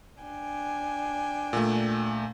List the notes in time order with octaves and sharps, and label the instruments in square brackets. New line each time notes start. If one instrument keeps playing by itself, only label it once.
[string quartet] D4 G5 G#5
[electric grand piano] A#2 A3